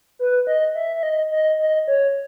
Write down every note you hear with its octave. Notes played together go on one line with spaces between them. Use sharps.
B4
D#5
E5
E5
D#5
D#5
D#5
C#5